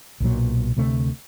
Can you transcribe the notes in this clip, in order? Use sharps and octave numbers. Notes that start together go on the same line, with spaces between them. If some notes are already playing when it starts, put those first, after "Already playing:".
B1 A#2 F#3
D2 C3 A3 C4